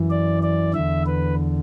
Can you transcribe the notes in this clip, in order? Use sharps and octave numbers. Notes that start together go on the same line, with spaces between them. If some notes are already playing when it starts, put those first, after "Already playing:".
Already playing: F#2 E3
D5
D5
E2 D3 E5
B4